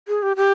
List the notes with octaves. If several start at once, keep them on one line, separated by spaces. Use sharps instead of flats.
G#4
G4
G4